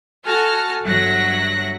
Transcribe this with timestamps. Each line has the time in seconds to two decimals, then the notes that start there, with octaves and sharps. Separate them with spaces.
0.24 F#4 A4 G#5 A5 F6 A#6
0.83 G1 F#3 E5 F#6 A#6